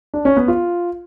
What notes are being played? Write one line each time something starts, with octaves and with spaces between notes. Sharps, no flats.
D4
C#4
B3
F4